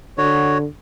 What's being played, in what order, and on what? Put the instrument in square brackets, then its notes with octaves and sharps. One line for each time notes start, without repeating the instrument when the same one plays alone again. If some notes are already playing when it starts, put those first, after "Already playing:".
[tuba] D3 [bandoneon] F#4 C#5